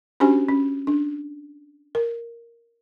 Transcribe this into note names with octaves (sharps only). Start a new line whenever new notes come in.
C#4 D4 F#4 G4 C5 G#5
C#4
D4
A#4